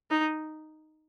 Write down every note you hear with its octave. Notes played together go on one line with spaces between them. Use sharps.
D#4